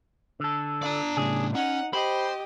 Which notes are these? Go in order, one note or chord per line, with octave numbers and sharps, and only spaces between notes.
D3 A4
D4 D5 A#5
A2 C#3 G#4
C#4 D#4 F#5
G4 C5 D#5 B5